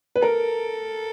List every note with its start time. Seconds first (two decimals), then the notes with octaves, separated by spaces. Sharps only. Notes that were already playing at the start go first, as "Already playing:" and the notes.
0.16 B4
0.22 A4 A#4